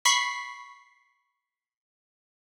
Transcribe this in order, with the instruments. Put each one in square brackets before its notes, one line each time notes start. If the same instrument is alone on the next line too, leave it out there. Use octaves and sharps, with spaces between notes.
[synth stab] B5 C#6 B6 C7